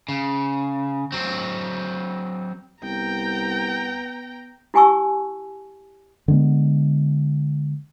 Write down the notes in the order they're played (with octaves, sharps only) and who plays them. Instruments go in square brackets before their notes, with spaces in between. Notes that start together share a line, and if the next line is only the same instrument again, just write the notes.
[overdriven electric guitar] C#3
F#3 C4
[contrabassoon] C2 [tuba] B3 [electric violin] G5 A#5
[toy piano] E4 G4 G#5 A5 C#6 E6
[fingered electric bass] D3 G#3 B3